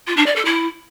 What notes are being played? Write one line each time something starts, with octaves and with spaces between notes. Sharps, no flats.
F4
D4
D5
A4
E4